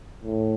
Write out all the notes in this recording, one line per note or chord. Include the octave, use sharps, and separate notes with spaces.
A2